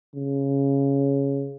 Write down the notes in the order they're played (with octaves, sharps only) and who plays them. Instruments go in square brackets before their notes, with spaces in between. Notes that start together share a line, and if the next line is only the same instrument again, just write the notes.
[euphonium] C#3